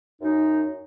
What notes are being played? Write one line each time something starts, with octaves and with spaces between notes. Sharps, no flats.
F#2 D#4